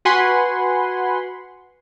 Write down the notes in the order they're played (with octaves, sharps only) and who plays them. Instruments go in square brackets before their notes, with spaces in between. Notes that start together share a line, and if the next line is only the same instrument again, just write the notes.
[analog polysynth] F#4 B4 F#5 G#5 B5 C6